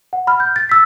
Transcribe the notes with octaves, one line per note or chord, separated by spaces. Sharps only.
F#5
B5 F6
G6
A6
E6 B6